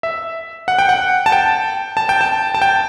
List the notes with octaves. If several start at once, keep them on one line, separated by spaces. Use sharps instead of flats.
E5
F#5
G5
F#5
A5
G5
A5
G5
A5
A5
G5